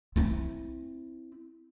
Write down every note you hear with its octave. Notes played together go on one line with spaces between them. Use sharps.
C4 E4